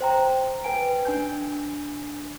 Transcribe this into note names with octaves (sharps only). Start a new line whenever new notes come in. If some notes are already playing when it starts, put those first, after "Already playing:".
C5 G5 A#5
B4 G5 G#5 D7
D4 G#5 G6